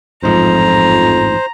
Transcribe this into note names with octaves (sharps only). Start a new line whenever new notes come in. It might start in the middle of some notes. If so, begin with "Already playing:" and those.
A1 F2 G#2 F3 C5 A#5